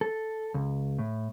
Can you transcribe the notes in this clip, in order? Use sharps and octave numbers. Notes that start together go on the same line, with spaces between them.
A4
C#2
A2